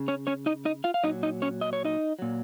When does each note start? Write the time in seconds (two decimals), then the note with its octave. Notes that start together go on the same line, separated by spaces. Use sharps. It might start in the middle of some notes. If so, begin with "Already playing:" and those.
Already playing: C#3
0.08 C#4 C#5
0.27 C#4 C#5
0.46 D#4 D#5
0.65 D#4 D#5
0.84 F4 F5
0.94 F5
1.03 A#2 F#3 D#4 D#5
1.23 D#4 D#5
1.42 C#4 C#5
1.61 D#5
1.73 C#5
1.85 D#4 D#5
2.19 A#2 F#3